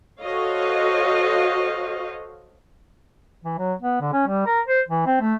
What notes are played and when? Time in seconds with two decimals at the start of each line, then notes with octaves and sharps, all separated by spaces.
0.21 F#4 A4 C5 C#5 D#5 F5
3.44 E3
3.58 F#3
3.82 B3
4.00 D3
4.13 C#4
4.27 G3
4.46 A#4
4.67 C5
4.88 E3
5.06 C4
5.21 A3